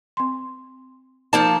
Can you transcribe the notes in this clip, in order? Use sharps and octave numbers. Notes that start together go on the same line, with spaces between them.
C4 C6
F3 A#3 D#4 A5